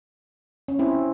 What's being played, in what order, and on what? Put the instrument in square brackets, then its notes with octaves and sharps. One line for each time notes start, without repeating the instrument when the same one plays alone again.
[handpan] C#4
C4 E4